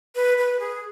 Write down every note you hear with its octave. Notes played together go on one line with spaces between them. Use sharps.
B4
B4
G#4